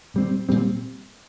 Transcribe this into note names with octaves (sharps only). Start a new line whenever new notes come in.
A#2 G3 C4
A#2 G3 C4